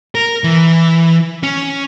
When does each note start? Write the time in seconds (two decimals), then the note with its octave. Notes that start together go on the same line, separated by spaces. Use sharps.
0.15 A#4
0.44 E3
1.43 C#4